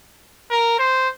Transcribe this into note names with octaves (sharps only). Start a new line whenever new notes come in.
A#4
C5